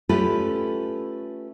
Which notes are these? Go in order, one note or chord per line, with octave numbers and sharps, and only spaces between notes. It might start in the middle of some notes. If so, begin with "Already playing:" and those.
A3 C#4 F4 G4 A4 B4